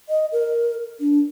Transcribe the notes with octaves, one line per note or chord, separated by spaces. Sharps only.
D#5
A#4
D4